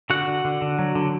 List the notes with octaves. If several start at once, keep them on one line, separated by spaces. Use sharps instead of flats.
D3 F#4 F#5
D3
D3
D3
F#3
D3